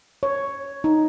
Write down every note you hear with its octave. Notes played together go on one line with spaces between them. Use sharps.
C#5
D#4